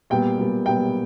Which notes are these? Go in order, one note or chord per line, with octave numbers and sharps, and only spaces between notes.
A#2 G3 B3 G5
A#2 G3 B3
A#2 G3 B3 G5